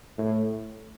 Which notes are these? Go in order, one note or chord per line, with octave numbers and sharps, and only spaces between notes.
A2